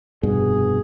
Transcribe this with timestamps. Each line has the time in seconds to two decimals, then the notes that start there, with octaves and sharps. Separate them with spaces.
0.23 F1 G2 B2 G#4